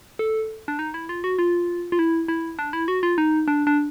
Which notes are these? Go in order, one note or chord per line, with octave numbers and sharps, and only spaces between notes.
A4
D4
D#4
E4
F4
F#4
F4
F4
E4
E4
D4
E4
F#4
F4
D#4
D4
D4